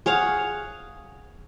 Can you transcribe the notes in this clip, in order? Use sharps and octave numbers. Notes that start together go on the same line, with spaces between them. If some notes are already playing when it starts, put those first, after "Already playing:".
G#4 C#5 F5 F#5